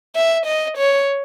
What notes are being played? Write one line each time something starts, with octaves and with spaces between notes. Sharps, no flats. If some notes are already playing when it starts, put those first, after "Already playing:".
E5
D#5
C#5